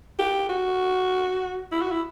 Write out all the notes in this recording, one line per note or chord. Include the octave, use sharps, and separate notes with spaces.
G4
F#4
E4
F#4
E4